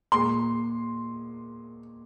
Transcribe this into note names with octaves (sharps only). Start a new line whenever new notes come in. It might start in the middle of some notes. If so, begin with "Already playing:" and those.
A#2 G#3 C6